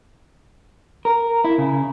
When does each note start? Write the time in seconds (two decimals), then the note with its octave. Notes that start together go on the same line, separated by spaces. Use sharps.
1.05 A#4
1.44 E4
1.58 C#3